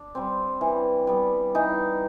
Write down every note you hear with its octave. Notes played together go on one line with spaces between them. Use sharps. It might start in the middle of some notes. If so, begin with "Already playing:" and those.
Already playing: D4
G3 C4
E3
G3 B3
E3 D#4